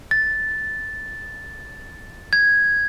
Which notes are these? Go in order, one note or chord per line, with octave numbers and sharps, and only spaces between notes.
A6
G#6